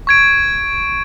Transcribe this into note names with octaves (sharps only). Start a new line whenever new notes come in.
C#6 G#6 D7